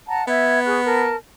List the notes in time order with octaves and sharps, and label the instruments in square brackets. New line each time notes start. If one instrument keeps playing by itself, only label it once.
[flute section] F#5 A5 A#5
[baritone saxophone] B3 [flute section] E5 G#6
[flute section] G#4 C#6 F#6
A#4 A5